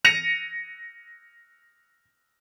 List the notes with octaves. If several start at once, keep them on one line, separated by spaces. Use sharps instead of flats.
A#6 C#7 D#7 F7